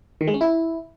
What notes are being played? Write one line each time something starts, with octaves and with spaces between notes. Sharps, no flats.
D#3
G#3
C#4
E4